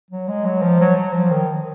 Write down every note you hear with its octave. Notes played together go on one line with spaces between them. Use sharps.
F#3
G#3
F#3
F3
F#3
F#3
F#3
F3
D#3